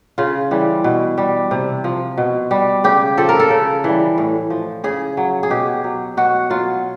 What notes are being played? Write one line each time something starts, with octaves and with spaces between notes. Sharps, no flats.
C#3 F4
E3 G3
B2
G3
C3
F3
B2
G3
C#3 G4
F3 A4
A#4
A4
C#3
E3 G3
A2
F3
C#3 G#4
F#3
G#4
B2 G4
F#3
B2 F#4
F#3 F4